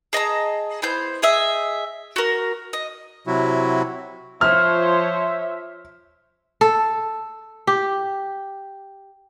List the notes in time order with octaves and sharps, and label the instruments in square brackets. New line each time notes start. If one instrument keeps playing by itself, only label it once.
[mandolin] G#4 D#5 A5 A#5
B3 E4 C5 G6
G#4 D#5 E5
F#4 A#4
D#5
[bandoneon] C3 F#3 E4 F#4
[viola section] F3 C5 C#5 [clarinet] E5 [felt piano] F6
[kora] A4
G4